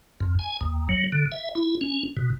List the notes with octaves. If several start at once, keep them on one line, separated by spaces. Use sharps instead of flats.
F2
G#5
D#2
F#3
D3
E5
E4
C#4
B2